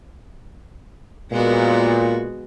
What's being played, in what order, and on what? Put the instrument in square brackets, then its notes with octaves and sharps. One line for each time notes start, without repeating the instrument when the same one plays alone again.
[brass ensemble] A#2 [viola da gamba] G#3 B3 F#4